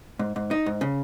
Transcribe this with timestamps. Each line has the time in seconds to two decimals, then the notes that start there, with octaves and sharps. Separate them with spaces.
0.19 G#2
0.36 G#2
0.51 D#4
0.66 G#2
0.81 C#3